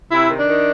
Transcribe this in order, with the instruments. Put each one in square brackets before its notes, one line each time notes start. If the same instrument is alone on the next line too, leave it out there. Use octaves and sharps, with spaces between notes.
[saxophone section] C3 E4
D#3
D4
D#3